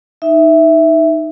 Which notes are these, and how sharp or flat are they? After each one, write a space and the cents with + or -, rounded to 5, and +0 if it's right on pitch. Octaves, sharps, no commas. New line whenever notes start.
D#4 +0 E5 +0